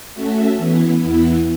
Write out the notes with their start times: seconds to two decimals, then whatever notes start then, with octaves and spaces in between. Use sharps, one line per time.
0.14 A3 C#4 F#4 A4 E5
0.57 E3 B3 E4
0.99 E2 E3 B3 E4